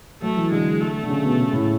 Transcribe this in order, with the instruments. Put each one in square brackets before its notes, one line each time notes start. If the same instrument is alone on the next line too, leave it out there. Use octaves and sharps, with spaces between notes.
[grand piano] F#3 [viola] A3
[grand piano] E3
[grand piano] D3 [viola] G#3
[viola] A3
[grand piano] D3
C#3
B2
C#3
A2